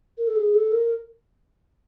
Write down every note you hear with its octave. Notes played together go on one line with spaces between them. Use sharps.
A#4
A4
G#4
A4
A#4